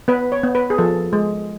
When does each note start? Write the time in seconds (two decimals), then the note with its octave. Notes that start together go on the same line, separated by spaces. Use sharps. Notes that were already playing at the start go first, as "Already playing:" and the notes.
0.08 B3 B4
0.32 C#5
0.43 B3
0.55 B4
0.70 G#4
0.78 F3 A4
1.13 G#3